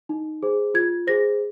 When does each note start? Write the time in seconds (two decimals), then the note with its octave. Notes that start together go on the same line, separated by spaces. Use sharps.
0.09 D#4
0.43 G#4 C5
0.74 F4 G#6
1.07 G#4 C5 A#6